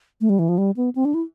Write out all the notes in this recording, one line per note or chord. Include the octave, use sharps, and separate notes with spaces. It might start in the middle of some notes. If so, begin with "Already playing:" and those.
A3
G3
E3
F3
G3
B3
C4
D4
E4